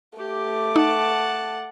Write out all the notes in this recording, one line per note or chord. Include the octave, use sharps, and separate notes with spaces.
A3 G4 D6
D#4 F#5 A5